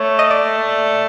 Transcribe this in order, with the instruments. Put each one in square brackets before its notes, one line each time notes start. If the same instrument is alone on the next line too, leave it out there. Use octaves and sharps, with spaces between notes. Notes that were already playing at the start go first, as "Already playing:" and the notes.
Already playing: [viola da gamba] A3 [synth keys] C#5
[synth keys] D#5
D5